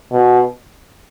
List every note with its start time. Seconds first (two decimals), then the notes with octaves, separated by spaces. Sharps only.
0.12 B2